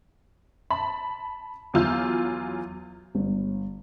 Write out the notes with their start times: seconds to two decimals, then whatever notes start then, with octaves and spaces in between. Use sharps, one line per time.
0.70 A5 B5
1.74 E2 F#3 F4 E6 G6
3.15 G1